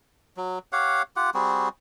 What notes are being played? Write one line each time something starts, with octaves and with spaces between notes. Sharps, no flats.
F#3
G4 C#5 F5 F#5
F4 G4 F#5
G3 C4 F#4 G#4